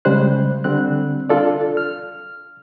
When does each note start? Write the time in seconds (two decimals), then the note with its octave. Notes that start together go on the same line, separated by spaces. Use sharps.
0.05 C#3 G3 G#3 C5 F#6
0.64 D3 G3 C4 F#6
1.29 D4 F4 A4 D5
1.77 F6